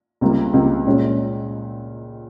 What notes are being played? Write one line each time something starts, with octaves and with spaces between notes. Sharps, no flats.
C#2 C3 G3 A#3
C#2 C3 G3 A#3
A#2 G#3 C#4